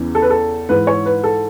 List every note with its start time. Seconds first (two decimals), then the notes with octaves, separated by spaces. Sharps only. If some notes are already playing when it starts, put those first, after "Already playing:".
Already playing: E2 C#3 E3
0.15 A4
0.22 B4
0.30 A4
0.69 G#2 E3 B4
0.87 C#5
1.06 B4
1.24 A4